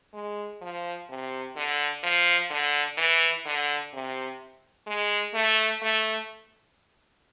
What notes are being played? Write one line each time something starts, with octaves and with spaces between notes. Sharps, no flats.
G#3
F3
C3
D3
F3
D3
E3
D3
C3
G#3
A3
A3